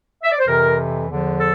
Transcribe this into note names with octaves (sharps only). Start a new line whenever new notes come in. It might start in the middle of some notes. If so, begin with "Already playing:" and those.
E5
D5
C5
F2 C3 E3 A#4
E2 D3 F3
A4